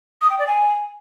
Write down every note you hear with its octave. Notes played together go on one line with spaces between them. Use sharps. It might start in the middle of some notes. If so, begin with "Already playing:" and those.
D#6
G5
D5
G#5